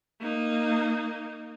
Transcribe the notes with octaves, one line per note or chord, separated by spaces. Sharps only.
A#3 D#4